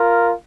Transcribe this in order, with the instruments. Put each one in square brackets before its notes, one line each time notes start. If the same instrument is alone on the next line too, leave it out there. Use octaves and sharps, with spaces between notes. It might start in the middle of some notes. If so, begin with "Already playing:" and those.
Already playing: [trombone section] F4 A#4